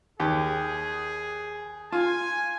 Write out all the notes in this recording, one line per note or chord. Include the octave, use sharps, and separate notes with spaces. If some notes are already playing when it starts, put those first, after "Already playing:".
D#2 G4 G#4
F4 G#5